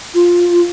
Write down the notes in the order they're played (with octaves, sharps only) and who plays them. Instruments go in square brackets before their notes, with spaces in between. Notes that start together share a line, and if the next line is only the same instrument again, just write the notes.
[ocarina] F4